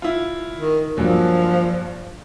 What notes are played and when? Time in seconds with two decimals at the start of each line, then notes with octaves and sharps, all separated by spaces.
0.02 E4 F4
0.56 D#3
0.97 G2 A#2 F3 F#3